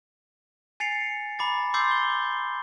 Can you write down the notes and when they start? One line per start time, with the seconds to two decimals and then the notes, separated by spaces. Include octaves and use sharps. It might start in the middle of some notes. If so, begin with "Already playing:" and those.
0.80 G#5 A6 C7 C#7 F7
1.39 A#5 B5 D6 A6
1.74 C6 D6 E6 G6 A6 C7
1.91 G7